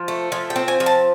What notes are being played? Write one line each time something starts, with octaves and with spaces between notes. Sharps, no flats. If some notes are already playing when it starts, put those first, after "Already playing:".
Already playing: F3
A3
F3 G#5
G5
C4
G#5
F3
A5